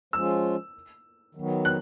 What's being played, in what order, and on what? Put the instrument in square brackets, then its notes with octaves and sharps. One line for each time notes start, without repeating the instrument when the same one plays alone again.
[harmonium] F3 G#3 C#4 F4 [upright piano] E6
[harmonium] D#3 F#3 B3
[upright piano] F#6